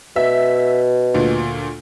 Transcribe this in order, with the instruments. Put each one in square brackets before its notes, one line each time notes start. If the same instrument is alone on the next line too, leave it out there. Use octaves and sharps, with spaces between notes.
[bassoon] B2 [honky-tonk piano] E5
[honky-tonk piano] D2 A#2